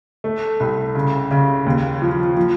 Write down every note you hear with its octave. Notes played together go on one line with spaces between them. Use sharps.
A3
C2
C#3
C#3
D#2
F3
F3